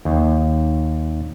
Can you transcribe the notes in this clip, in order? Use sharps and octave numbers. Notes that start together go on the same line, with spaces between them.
D#2